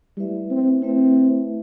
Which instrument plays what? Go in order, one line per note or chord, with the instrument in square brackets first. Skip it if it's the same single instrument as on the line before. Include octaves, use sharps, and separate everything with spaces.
[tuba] G3 [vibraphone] A3 E4 B4 E5
[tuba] C4
[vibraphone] A3 E4 B4 E5 [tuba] C4